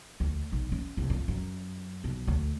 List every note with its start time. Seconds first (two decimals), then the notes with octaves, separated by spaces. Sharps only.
0.20 D2
0.52 B1
0.72 C#4
0.97 C2
1.10 F2
1.28 F#2
2.04 B1
2.27 D2